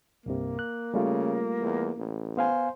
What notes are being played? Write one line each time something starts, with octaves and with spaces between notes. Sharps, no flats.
C2 G2 C3 A#3
F#6
C#3 G3 A3 F4
E2
A1
B3 C5 F5 G#5